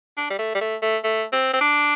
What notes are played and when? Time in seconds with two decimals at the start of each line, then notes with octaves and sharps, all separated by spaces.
0.17 D4
0.30 G3
0.39 A3
0.55 G3
0.61 A3
0.82 A3
1.04 A3
1.33 C4
1.53 C4
1.61 D4